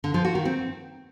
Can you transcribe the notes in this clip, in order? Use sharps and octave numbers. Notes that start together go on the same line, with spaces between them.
D3
F3
F#4
D#3
C4